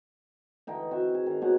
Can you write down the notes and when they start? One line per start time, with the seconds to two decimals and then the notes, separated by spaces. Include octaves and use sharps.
0.67 D3 E3 D#4 G5
0.91 C4 F#4 E5
1.14 G#4
1.26 D#3 F5
1.42 B2 D#4 C#5 F#5